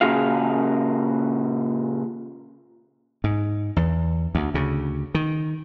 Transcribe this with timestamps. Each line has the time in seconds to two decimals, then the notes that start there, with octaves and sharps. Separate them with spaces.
0.01 A#2 C#3 F#4 G#4 F5
3.24 G#2
3.76 E2
4.35 D2
4.54 D2 C#3
5.15 D#3